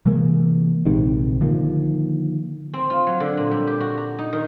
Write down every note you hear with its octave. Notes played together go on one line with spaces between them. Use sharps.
C3 E3 G#3 A#3
A#1 G#2 C3 D#3
D3 D#3 F3 A#3
C4
F4
F#3
D3
A#2
G3
G4
F#4
A#5
D#4
D#3